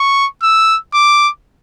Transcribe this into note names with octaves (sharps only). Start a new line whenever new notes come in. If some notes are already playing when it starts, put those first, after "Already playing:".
Already playing: C#6
E6
D6